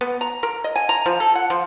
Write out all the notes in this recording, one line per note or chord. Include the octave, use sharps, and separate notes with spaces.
B3
A#5
A#4
D#5
G#5
A#5
F3
A4
F#5
F3